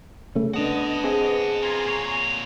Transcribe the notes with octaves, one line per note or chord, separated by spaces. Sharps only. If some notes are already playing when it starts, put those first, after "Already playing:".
C#3 A3 C#4
B3 C#4 D4 D#5 F#5 A5
C4 G#4
B3 F4 G#5 A#5 C6
A#2 C#5